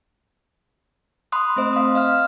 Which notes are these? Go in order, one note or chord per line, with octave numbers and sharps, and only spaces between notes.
B5 C6 D#6 F#6
A3 C4 C5 D#5
F5 C6 D#6
D#5 F5 F6